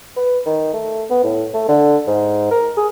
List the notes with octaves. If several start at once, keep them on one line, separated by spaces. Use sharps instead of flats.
B4
D#3
A3
B3
A2
A3
D3
G#2
A#4
G#4